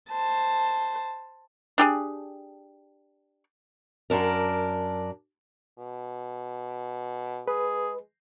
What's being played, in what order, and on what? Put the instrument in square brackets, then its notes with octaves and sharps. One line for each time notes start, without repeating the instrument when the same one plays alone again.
[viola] C5 A5
[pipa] D4 G4 G#4
[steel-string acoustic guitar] F#2 D4 A#4
[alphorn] B2
[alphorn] G#3 [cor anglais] G#4 [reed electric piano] B4